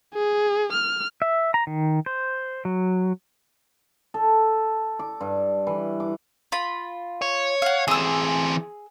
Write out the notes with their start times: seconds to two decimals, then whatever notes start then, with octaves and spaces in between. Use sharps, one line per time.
0.14 G#4
0.73 F6
1.22 E5
1.54 A#5
1.67 D#3
2.06 C5
2.65 F#3
4.14 A4
4.99 D6
5.21 G2
5.67 E3
6.00 D6
6.52 F4 B5
7.22 C#5
7.62 F5 F#5
7.88 E3 C4 G#4 E6